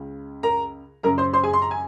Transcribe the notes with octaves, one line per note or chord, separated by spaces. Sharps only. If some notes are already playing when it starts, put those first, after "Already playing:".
Already playing: C#2 C#3
A#4 A#5
F#2 C#3 A#4 A#5
C5 C6
C5 C6
G#4 G#5
C6
A#5
G#5